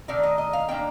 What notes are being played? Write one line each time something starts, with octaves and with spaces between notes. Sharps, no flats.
D#3 A3 D#4 D5
D#5
D#5
F5
D#3 A#3 D4 G5